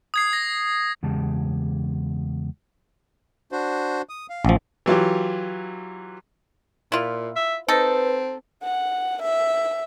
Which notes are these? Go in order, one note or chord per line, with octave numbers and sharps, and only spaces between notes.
D#6 G#6 C7
A#6
E2 C#3 G#3 G4 A5
D4 F#4 C5
D#6
F5
A1 F3
E3 F#3 F4 G4
A#2 E4 F4
E5
C4 D#4 A4 B4
F#5
E5